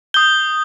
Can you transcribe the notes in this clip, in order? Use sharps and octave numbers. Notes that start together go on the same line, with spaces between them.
D#6 G6 G7